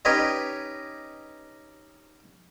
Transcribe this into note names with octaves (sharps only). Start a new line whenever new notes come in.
C#4 D#4 G4 B4 C#5 D#5